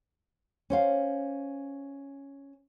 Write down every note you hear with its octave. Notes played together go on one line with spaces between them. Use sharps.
C#4 C5 F5